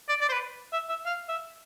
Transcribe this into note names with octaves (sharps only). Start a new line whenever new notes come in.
D5
D5
C5
B4
E5
E5
F5
E5